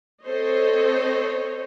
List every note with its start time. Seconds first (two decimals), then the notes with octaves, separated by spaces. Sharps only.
0.24 C4 A4 C5 C#5 D#5